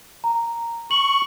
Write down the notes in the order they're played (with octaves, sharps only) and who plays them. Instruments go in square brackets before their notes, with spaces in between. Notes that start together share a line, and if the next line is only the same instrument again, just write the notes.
[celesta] A#5
[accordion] C#6 [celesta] F#7